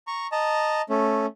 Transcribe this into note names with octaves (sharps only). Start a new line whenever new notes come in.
A#5 C#6
D#5 A5 A#5
A3 C#4